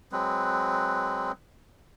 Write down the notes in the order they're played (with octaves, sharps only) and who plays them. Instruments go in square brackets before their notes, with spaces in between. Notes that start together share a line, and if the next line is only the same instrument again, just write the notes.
[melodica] F#3 G#3 C4 B4